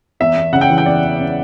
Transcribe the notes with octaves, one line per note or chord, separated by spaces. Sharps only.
E2 E5
E2
C#3 F#5
G5
E3
G5
E2 D5
E2
C#3